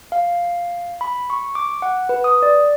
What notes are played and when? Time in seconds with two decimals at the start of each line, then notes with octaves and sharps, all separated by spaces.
0.12 F5
1.01 B5
1.30 C#6
1.55 D6
1.82 F#5
2.09 B4
2.24 D#6
2.42 D5